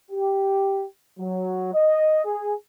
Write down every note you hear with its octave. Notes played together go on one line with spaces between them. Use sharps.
G4
F#3
D#5
G#4